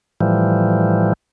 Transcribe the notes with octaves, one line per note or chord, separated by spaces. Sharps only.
A2 E3 F3 G3